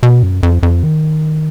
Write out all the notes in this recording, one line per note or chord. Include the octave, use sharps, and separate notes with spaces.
B2
F#2
F2
F2
D#3